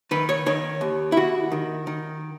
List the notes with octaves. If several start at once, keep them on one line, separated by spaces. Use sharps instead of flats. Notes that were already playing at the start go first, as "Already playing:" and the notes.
D#3 B4
C#5
D#3 C#5
D#2
E4
D#2 F#4
D#3
D#3